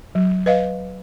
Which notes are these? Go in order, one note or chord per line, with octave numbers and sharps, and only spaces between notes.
F#3
B4 D#5 F5